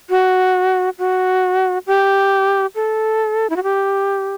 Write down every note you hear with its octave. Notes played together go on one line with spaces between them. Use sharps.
F#4
F#4
G4
A4
E4
F#4
G4